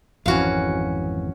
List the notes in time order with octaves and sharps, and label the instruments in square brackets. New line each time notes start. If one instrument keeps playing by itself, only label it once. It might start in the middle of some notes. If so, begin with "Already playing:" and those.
[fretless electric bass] G#1 F2 E3 [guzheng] C#4 F#4 F5